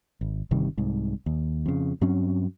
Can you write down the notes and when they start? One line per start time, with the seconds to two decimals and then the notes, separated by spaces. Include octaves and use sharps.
0.21 G#1
0.51 G1 C3 D#3 G3
0.78 C2 G#2
1.26 D#2
1.66 F2 C#3
2.01 G2 F#3 C4 C#4